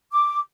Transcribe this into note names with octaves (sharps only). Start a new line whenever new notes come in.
D6